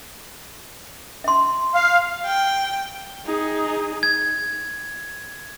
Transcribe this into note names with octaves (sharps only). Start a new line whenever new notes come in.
E5 C6
F5
G5
D#4 G#4
G#6